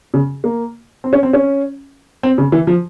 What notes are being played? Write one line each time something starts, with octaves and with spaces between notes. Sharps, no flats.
C#3
A#3
C4
C#4
C4
C#4
C4
C#3
E3
F3